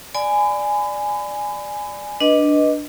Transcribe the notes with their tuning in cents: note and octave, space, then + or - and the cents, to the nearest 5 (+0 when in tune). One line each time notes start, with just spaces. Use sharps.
D5 +5 G#5 +0 B5 +35
D4 +0 B4 -15 D#5 +0